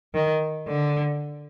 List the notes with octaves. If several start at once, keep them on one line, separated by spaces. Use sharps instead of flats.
D#3
D3